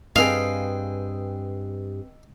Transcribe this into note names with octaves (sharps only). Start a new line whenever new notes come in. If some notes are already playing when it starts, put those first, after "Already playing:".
G2 C4 G#4 A4 B4 D#5 F5 G5